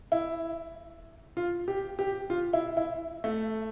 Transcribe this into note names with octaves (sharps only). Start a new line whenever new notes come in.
E4
F4
G4
G4
F4
E4
E4
A3